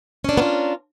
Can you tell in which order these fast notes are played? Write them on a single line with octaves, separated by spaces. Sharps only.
C#4 D4 A#4 B3 F4